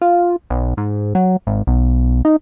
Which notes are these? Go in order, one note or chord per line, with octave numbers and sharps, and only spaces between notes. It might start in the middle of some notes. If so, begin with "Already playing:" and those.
F4
B1
G#2
F#3
G#1
B1
D#4